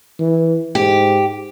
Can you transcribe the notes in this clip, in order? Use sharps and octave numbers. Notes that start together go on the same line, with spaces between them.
E3
G#2 G4